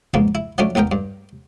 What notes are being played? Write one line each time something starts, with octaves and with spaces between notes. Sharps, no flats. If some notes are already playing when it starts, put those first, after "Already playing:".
G#2 F3 A#3 B3
E4
F3 F#3 A3 C#4 D4
A1 E2 B3 A#4 G5
G2